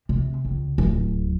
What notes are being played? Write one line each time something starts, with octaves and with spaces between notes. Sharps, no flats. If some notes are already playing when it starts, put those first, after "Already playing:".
C3
C#2
D1